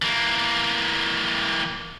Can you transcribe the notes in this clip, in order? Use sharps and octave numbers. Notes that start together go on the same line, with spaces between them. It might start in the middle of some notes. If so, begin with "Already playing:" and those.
E3 A#3